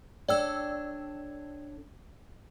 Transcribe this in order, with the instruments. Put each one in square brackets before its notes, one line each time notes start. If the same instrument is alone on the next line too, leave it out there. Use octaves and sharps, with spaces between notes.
[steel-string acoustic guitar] D4 A4 C#5 [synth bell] D5 G5 E6